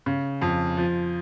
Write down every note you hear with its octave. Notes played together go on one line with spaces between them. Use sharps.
C#3
F2
F3